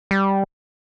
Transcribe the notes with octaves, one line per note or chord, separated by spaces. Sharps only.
G3